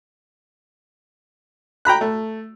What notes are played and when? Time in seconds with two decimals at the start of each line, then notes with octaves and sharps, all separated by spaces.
1.85 G5 A#5 B5 F#6
2.01 A3